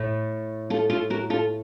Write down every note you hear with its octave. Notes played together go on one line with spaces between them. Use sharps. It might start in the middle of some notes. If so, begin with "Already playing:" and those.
Already playing: A2 A3
F4 A4
F4 A4
F#4 A#4
F4 A4